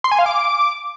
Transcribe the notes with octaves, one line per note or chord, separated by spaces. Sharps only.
C6
G#5
F5
D6